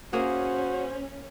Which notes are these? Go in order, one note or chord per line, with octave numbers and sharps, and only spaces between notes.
A#3 C#4 F#4 G#4 C5